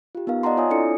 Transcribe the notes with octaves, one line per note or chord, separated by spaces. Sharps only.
F4 G4
B3 D#4 A#4 F5
D5 D#5 F#5 A5 A#5 C6
F4 C#5 E5 G#5 D#6
C4 D4 E4 A4 D5 C#7